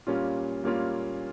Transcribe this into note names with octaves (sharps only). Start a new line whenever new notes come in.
A#2 G3 A#3 C#4 F4
A#2 G3 A#3 C#4 F4